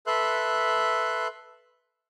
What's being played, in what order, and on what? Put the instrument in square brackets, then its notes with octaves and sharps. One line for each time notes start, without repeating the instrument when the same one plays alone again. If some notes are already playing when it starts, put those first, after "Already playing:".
[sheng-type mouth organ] A4 B4 E5 C6 F#6